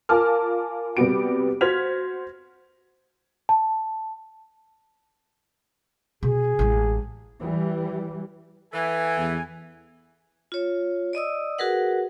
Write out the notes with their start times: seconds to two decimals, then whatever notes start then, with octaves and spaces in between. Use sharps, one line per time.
0.09 F4 A#4 G#5 A5 D6 F6
0.97 C3 G3 B3 F#4 G4 D7
1.61 F#4 C5 F6 G#6 B6 F7
3.49 A5
6.23 B2 G#4
6.59 A1 G#3
7.40 E3 G3
8.73 E3 B3 A4 E5 G#5
9.18 E2
10.52 F4 C#5
11.13 D5 D#5 D#6 E6
11.58 F#4 G#4 A#4 B4 F#5